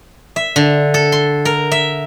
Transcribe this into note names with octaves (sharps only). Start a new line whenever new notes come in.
E5
D3
A4
C6
A#4
E5